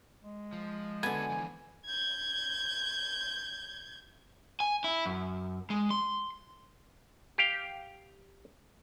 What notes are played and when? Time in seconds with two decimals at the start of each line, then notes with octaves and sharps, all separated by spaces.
0.23 G#3
0.53 F3
1.03 D3 B3 F#4 A4 G#5
1.30 E3 F3
1.85 G6 G#6
4.60 G#5
4.84 E4
5.06 F#2
5.70 G#3
5.91 C6
7.38 G4 F5 G5